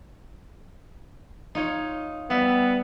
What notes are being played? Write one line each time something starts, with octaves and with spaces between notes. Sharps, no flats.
D#4 F4 C#5
G3 B3 E5